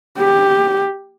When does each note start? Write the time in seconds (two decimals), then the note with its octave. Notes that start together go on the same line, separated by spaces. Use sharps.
0.18 G4